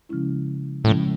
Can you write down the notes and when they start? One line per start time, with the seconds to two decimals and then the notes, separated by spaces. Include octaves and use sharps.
0.09 C#3 F3 G#3 C#4 E4
0.84 A2 C#3 F3 G#3 C#4 E4